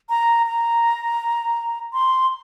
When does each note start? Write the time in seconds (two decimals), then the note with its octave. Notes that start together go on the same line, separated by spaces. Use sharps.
0.09 A#5
0.46 A#5
1.93 C6